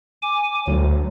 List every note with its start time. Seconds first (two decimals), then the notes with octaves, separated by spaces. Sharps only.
0.22 G#5 D6
0.67 D2 F#3